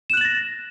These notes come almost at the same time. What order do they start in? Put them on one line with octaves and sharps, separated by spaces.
E7 F#6 F#7 A6 A#6